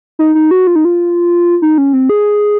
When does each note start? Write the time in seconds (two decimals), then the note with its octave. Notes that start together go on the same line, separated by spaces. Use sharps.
0.19 D#4
0.35 D#4
0.51 F#4
0.67 F4
0.76 D#4
0.85 F4
1.62 D#4
1.78 C#4
1.93 C4
2.09 G#4